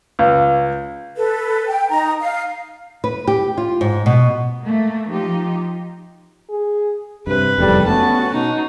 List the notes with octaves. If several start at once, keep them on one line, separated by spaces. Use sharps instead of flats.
C#2
A4 B4
G5
D#4 A#5
F5
B4
G4
F4
G#2
B2
A3 A#3
F3 D#4 F4 G4
G#4
G2 C3 B4
F1 E2 G#2 G3 A4
A3 B3 C#4 F#4 A5
B2 D#4